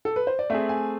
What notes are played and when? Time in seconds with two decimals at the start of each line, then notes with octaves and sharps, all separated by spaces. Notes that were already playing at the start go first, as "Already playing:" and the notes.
0.05 A4
0.16 B4
0.27 C5
0.39 D5
0.50 A3 C4 G#4 E5
0.69 G#5